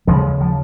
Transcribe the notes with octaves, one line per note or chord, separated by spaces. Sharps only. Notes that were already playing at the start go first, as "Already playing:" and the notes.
D#2 C#3 F3 G#3
F3